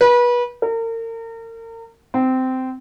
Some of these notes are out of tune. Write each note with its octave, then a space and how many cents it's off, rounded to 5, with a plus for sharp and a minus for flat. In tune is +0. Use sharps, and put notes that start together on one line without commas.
B4 -30
A#4 -35
C4 -15